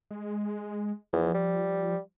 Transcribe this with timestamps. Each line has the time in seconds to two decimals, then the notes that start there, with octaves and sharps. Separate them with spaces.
0.11 G#3
1.13 E2 F3
1.34 G3